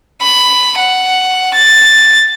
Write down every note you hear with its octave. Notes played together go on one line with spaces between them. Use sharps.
B5
F#5
A6